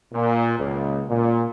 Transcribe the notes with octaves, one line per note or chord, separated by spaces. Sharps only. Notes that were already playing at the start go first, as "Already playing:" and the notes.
A#2
C#2
A#2